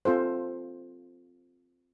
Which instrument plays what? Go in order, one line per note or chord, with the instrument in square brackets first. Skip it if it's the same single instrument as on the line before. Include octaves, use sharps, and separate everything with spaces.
[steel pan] C4 F4 A4 C5